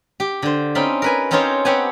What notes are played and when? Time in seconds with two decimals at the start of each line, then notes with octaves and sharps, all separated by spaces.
0.20 G4
0.42 D3 C5
0.75 C4 C#4 D#4 F4 B5 C6
1.02 A#4 B4 G#5
1.31 C4 C#4 D#4 F4 C5 C#5
1.65 B3 C4 G4 C#5 F#5 G#5